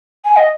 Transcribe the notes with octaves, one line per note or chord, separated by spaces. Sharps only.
G#5
D#5